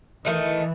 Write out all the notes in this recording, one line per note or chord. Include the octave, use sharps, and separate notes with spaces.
D#3 E3 A3 D#4